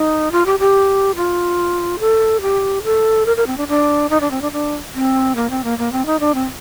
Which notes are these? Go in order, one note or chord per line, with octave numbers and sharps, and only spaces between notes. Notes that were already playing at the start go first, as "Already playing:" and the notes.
Already playing: D#4
F4
G4
G4
F4
A4
G4
A4
A#4
A#4
C4
D4
D4
D#4
D4
C4
D4
D4
C4
A#3
C4
A#3
A#3
C4
D#4
D4
C4